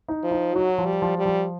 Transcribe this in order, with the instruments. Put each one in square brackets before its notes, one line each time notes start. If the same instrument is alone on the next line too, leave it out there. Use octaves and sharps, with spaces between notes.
[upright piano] D#4
[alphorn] F3
[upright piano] D#4
[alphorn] F#3 [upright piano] F#4
[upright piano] F3
[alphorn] G3
[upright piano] F3
[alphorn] G3
[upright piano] F3